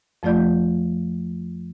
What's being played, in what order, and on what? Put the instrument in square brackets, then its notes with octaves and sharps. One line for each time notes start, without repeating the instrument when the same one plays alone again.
[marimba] F2 F3 A3 F4 D5 G6